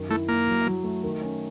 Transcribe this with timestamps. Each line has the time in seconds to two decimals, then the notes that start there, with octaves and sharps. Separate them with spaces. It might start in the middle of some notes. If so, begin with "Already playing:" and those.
Already playing: F#2 D#3
0.09 A3 E4
0.28 A#3 E4
0.47 F#3
0.66 F#3
0.84 A3
1.03 D#3
1.22 C#4